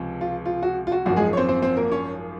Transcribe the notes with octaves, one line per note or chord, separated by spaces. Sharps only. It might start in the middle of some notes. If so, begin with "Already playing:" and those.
Already playing: C#2 C3 F3
F4
F4
F#4
F4
F#4
G#1 F#2 F3 F#4
G#3 G#4
C#5
C4 C5
C4 C5
C4 C5
A#3 A#4
C#4 C#5